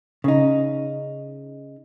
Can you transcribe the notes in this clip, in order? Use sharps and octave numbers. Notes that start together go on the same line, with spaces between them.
C#3 D#4